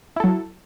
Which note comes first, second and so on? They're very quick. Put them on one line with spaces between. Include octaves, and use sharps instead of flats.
E4 A4 F#3